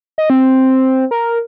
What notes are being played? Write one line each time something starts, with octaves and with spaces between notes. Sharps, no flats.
D#5
C4
A#4